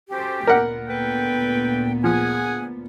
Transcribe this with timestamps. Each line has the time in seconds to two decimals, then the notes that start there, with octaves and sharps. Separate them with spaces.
0.11 C#4 F#4 G4 A4 C5
0.47 D2 A#2 B3 A#4 F#5
0.88 A4 B4 G5
2.04 F3 G#4 F#5 G#5